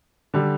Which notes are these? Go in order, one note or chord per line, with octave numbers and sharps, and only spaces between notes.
D3 G3